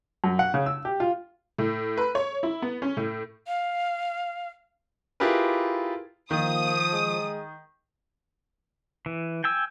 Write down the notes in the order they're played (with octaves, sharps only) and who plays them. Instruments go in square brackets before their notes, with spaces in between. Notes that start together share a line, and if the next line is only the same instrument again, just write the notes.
[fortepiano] F#2
F#5
C#3
E6
G4
F4
[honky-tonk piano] A2
B4
C#5
E4
B3
C#4
A2
[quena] F5
[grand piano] E4 F4 G4 G#4 A#4 B4
[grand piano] D#3 [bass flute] F3 [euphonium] A#3 [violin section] D#6
[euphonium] G#3
[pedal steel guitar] E3
G5 G#5 E6